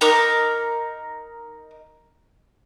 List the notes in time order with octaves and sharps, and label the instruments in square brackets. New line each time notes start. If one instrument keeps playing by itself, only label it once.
[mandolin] D#4 A#4 D6